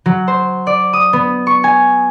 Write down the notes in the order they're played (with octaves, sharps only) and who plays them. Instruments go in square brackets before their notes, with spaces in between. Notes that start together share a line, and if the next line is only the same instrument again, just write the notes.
[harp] F#3
C5
D5
D#6
B3
C#6
G#5